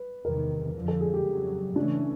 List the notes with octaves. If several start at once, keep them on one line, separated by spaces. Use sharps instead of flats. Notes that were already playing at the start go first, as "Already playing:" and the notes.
Already playing: B4
E2 C3 D#3 A#4
F2 D3 F3
A4
G#4
G4
F2 C#3 F#3
C#3 E3 A3 C#4 D4